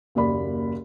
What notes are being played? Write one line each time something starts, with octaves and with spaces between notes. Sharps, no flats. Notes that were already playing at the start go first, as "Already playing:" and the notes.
F#1 D#2 D5 B5